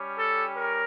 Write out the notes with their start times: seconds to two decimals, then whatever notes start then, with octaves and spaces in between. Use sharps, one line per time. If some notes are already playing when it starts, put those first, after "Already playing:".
Already playing: G3 C#4 G4
0.17 A4
0.56 A#4